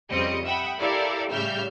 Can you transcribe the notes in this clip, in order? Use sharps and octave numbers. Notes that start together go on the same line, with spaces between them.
F2 C#3 G3 C4 D#5 C#7
E5 F#5 G5 B5 D#6
E4 G4 A4 A#4 D5 F5
A2 C#3 G3 E5 F6 G6